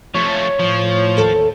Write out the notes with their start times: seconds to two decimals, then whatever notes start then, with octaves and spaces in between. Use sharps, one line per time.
0.14 F3 A3 C#5
0.59 A2 F3 G6
1.17 D#2 A4